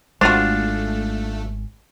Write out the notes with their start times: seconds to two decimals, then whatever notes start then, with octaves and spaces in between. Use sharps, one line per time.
0.21 G#1 C#2 G#3 A3 D4 F4 F#4 C5